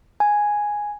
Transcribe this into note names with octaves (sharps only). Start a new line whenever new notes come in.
G#5